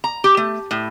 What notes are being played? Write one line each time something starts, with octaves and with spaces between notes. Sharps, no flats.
A#5
G4
A3
A2